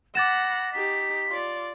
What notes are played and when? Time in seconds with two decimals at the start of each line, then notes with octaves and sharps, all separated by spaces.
0.15 F#5 B5 D6 A6 A#6 E7
0.73 D#4 G4 B6
1.29 F4 D5